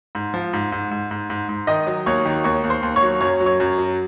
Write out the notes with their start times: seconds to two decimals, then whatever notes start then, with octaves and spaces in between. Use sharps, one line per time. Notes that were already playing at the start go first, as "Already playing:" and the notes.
0.15 G#2
0.34 F3
0.53 G#2
0.72 G#2
0.91 G#2
1.11 G#2
1.30 G#2
1.49 G#2
1.67 D#3 D#5 D#6
1.87 F#3
2.06 D#2 C#5 C#6
2.25 D#3
2.44 D#2 C#5 C#6
2.64 D#2
2.70 C5 C6
2.83 D#2
2.96 C#5 C#6
3.02 F#3
3.21 F#2 C#5 C#6
3.40 F#3
3.46 C#5 C#6
3.60 F#2
3.78 F#3